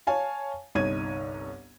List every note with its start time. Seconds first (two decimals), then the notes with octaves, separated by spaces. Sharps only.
0.07 C#5 F5 G#5 A5
0.75 G1 C2 D#4 C#5 G#6 D#7